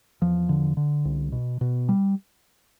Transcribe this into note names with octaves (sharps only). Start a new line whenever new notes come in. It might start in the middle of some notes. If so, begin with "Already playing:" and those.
E2 F3
D3
D3
C2
B2
B2
G3